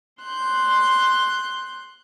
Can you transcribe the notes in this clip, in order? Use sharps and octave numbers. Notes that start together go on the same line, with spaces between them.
C6 F#6 G6